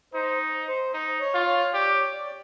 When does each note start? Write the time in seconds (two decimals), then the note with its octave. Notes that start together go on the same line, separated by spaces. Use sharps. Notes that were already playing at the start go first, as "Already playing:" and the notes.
0.14 D#4 C5
0.68 C5
0.94 D#4
1.20 C#5
1.34 F4
1.47 C#5
1.74 G4 D5
1.94 C#5
2.13 D5